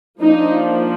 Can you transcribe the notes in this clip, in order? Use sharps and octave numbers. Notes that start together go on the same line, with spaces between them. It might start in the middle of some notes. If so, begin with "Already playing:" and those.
F3 A#3 D4 D#4